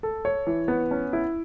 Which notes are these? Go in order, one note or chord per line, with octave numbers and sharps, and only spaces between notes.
A4
C#5
E3
B3
C#4
E4